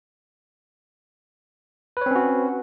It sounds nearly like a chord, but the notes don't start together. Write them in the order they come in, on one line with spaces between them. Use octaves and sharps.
B4 C#5 C4 C#4 F#4